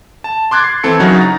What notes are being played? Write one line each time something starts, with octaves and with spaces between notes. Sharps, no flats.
A5
C6 D6 F#6 G#6 A6
C7
E3 C4 A4 G#6 C#7
C#3 F#3 D#4 E4 F#4 A#4
A#5 A6